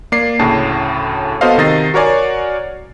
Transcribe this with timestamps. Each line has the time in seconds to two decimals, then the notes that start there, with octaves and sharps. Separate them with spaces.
0.12 A#3 D5 C7
0.39 D2 A2 C#3 A5
1.41 B3 F#4 A4 C5 D#5 F5
1.57 C3 D#3 D#5 A6 C7
1.94 F#4 A#4 C#5 D5 G#5